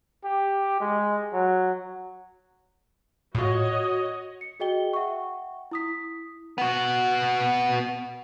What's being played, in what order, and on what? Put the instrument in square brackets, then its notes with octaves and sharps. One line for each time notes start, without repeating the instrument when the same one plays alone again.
[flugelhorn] G4
G#3
F#3
[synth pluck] A2 F4 [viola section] F#4 C#5 D#5
[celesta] C#7
F#4 G#4 D#5 G5 G7
E5 F#5 G5 C#6
E4 D#6 B6
[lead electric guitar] B3 F#4